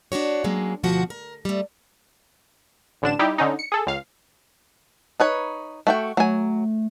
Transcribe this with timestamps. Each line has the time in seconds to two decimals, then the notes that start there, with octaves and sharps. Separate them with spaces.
0.12 D4 D#4 F#4 C#5
0.44 F#3 G#3 A#3 C#4
0.83 D2 B2 F3 F#4 F#5
1.10 A#4
1.45 G3 A3
3.02 A1 D3 D4 E7
3.19 G3 D#4 E4 G4
3.38 D3 C#4 D#4
3.59 C#7
3.72 G#4 A4
3.86 C#2 F5
5.20 D#4 B4 C#5
5.87 A3 F#4 G5 C#6
6.17 F#3 A3 G#5